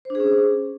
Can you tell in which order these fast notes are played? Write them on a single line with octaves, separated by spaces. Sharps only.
C5 D4 G#4 C#4